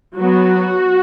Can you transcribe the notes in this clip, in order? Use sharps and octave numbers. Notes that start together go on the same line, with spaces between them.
F#3 B3 F#4